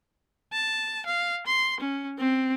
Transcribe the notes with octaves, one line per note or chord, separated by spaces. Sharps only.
A5
F5
C6
C#4
C4